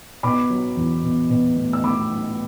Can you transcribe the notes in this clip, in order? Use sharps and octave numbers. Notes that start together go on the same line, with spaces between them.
B2 B5 D6
F#3
E2
B2
B2
A3
E6
A3 B5 D6
F#3